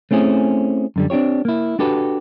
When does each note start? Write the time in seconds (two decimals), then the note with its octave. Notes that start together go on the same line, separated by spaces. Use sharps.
0.11 A3 C4 C#4 E4 G#4
0.96 F#2 D3 G3
1.10 C4 D4 F4 G4 C#5
1.45 A#3 E4
1.79 D4 F#4 G4 A4 B4